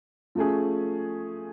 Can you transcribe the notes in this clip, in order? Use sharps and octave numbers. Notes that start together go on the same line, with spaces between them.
F3 A3 C#4 G#4